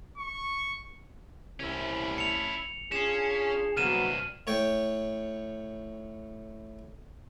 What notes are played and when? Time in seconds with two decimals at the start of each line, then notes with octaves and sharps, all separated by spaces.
0.18 C#6
1.60 C2 C#4 E4
2.18 C#7 F7
2.92 C#4 D4 F4 G#4 C7 E7
3.77 C2 G2 F#3 A#3 B3 F6 D#7 E7
4.47 A2 C#5 G5